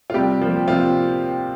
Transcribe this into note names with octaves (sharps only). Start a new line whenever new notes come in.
F4
C3 G3 G4
F3 A#3
C3 F3 F4